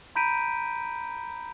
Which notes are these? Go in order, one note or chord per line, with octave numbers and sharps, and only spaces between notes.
A#5 B5 G6 B6 D7 D#7